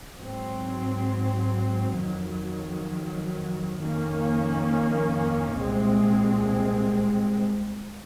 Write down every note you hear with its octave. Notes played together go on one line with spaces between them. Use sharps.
G#2 F#3 C4
F2 D#3 F#3
F2 D#3 A#3 C#4
C2 A#2 G#3 C4